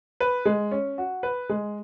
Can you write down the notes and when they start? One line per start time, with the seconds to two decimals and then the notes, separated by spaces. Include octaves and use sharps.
0.20 B4
0.45 G#3
0.71 C#4
0.98 F#4
1.23 B4
1.49 G#3